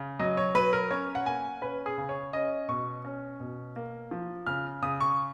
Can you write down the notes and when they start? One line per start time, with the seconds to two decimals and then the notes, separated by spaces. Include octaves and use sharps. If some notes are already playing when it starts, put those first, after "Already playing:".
Already playing: C#3
0.19 F#3 D#5
0.37 C#5
0.55 F#3 B4
0.73 A#4
0.91 C#4 C#5
1.15 F#5
1.26 A#3 G#5
1.62 C#4 B4
1.86 G#4
1.98 C#3
2.09 C#5
2.33 C#4 D#5
2.68 B2 C#6
3.05 C#4
3.40 B2
3.76 A#3
4.11 F3
4.46 C#3 F6
4.82 C#3 D#6
5.01 C#6